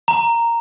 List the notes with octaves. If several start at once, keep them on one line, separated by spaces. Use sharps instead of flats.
A#5